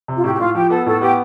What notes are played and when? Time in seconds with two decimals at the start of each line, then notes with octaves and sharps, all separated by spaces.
0.08 C3
0.16 F4
0.24 A2 G4
0.34 G4
0.39 A2 F4
0.55 F3 G4
0.70 B3 A4
0.86 A2 A4
1.01 B3 G4